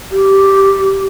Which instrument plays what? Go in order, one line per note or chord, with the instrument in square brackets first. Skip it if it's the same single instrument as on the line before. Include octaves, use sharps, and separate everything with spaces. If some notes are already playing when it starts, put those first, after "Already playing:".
[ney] G4